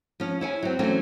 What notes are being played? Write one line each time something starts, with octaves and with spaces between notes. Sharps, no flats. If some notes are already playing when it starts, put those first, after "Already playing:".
F3 C#4
E4 C#5 G#5
F#3 C4
E3 F#3 A3 C4 C#4